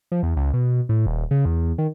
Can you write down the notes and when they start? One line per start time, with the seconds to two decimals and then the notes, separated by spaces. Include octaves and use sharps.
0.12 F3
0.23 E2
0.36 C#2
0.54 B2
0.89 A2
1.06 D#1
1.31 C#3
1.45 E2
1.78 D#3